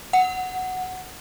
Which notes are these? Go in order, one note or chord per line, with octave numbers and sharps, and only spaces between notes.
F#5